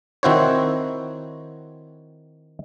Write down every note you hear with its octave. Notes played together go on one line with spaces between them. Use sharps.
D#3 C4 E4 F#4 C5 C#5